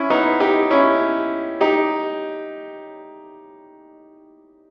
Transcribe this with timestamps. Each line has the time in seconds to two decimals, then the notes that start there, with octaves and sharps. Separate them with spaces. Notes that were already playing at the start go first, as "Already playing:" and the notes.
Already playing: C#4 E4
0.10 B3 D#4
0.40 D#4 G4
0.71 C#4 E4
1.61 D#4 G4